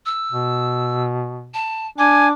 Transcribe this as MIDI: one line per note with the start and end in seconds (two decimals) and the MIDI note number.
0.05 1.03 88
0.32 1.56 47
1.54 1.87 81
1.98 2.32 62
1.98 2.28 80
1.98 2.31 86